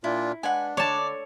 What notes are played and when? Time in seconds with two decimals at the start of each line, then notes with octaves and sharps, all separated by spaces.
0.04 A#2 D4 E4 F4
0.43 G#3 D4 B4 F#5 G#5
0.77 D3 C#5 D5 A5